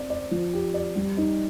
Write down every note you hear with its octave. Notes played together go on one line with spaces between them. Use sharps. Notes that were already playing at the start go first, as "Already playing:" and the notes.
Already playing: C4 D5
D5
F3
G4
D5
G3
D#4